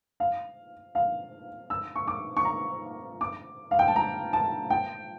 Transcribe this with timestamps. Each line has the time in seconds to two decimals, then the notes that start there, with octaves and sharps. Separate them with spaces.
0.20 F5
0.95 F5
1.70 E6
1.96 C#6
2.08 D6
2.37 C#6
2.45 A#5
3.21 D6
3.71 F5
3.79 G5
3.88 A5
3.96 A#5
4.33 A5
4.70 G5